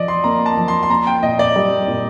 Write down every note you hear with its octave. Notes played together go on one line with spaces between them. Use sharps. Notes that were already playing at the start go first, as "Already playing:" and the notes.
Already playing: F3 D5 D#5
C6
A#3 A#5
A5
F3
C6
C6
A#3 A#5
G5
A#2 D#5
D5
G3
A#2